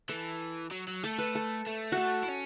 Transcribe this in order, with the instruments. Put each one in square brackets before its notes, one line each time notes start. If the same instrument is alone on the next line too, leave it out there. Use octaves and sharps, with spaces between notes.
[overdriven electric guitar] E3 [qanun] A4
[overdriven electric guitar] F#3
F#3
[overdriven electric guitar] A3 [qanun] A4
[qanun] B4
A4
[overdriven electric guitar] A3
[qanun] F#4
A4
[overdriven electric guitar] E4
C#4